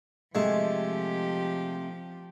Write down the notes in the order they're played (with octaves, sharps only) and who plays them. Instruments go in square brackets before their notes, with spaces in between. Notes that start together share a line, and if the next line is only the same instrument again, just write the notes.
[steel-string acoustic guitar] C3 A3 [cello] F3 G4 [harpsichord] G#3